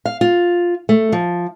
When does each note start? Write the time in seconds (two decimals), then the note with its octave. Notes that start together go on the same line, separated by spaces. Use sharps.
0.05 F5
0.21 F4
0.89 A3
1.12 F3